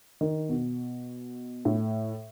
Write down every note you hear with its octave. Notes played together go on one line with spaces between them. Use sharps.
D#3
B2
A2